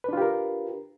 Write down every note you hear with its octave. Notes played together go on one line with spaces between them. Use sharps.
D4 F4 G4 A#4 B4